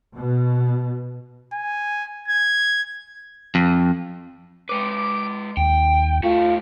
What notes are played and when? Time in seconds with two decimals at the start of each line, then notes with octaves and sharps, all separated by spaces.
0.17 B2
1.53 G#5
2.28 G#6
3.55 F2
4.69 G#3 B4 D6
5.57 D#2 G5
6.24 G2 A3 F4